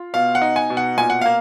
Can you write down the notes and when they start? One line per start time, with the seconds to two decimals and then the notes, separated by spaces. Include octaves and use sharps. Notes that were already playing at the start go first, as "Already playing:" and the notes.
Already playing: F4
0.14 B2 F5
0.35 F#5
0.42 D#4
0.56 G#5
0.70 B2
0.77 F#5
0.97 A#2 G#5
1.10 F#5
1.21 A#3 F5